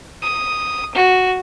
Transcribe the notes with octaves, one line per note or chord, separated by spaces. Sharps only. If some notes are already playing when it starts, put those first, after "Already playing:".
D#6
F#4